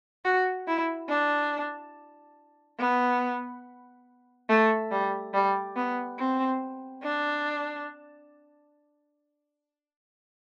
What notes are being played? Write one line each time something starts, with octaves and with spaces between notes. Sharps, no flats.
F#4
E4
D4
B3
A3
G3
G3
B3
C4
D4